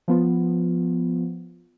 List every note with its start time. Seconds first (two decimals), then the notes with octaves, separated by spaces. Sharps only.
0.08 F3 B3 F4